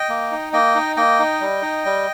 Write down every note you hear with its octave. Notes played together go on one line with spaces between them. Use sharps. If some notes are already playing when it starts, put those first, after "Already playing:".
Already playing: D#5 G5
A#3
D#4
A#3 D#5 G5
D#4
A#3 D#5 G5
D#4
G3
D#4
G3